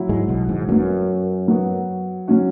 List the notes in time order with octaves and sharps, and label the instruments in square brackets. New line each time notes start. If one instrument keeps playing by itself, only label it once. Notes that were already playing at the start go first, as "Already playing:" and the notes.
Already playing: [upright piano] F#3 E4
[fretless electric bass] G#2 G#3
B1 B2
G#1 G#2
[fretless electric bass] F#2 [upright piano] F#3 B3 F#4
[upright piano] F#3 B3 F#4
F#3 C#4 F#4